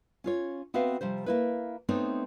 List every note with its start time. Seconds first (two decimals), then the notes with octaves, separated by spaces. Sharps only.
0.24 C#4 F4 C#5
0.74 B3 C4 F#4 B4 E5 F5
1.01 C3 F3 G3 C5
1.26 A#3 E4 B4
1.88 A3 B3 C4 D#4 C#5